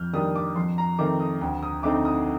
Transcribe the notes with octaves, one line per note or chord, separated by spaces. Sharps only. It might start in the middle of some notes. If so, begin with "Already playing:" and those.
Already playing: F2 F6 G6
D#3 G3 A#3 D4 D#6
D6
F2 C6
A#5
D#3 A3 C4 D6
D#6
D2 G5
D#6
D3 A3 C4 D#4 D6
D#6